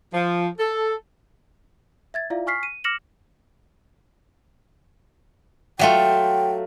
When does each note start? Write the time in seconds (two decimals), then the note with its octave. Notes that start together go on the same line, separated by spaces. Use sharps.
0.13 F3
0.59 A4
2.14 E5 G#6 A6
2.30 E4 F4 D5 E5 F5
2.47 G#5 C#6 F6 B6 C7
2.63 D#7
2.84 D6 F6 A#6 C#7 E7 F#7
5.79 F#3 A3 F4 G5